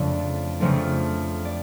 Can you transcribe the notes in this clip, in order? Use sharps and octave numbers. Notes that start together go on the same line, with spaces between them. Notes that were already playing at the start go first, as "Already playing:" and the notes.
Already playing: F2 C#3 F3 A3 D4 D5
F2 C#3 F3 A3 D4
D5